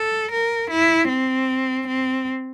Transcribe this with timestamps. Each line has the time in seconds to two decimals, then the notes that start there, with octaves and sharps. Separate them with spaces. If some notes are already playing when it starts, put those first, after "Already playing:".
Already playing: A4
0.32 A#4
0.71 E4
1.09 C4
1.88 C4